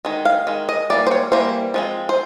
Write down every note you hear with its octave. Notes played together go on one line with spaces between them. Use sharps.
D#3 G#3
F5
D#3 G#3
D#5
E3 G3 A#3 D5
C5
C#5
E3 G3 A#3 C5
F3 G#3 C4
C5